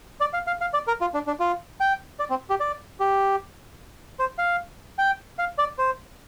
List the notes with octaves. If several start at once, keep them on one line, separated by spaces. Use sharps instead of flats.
D5
F5
F5
F5
D5
A#4
F4
D4
D4
F4
G5
D5
C4
G4
D5
G4
C5
F5
G5
F5
D5
C5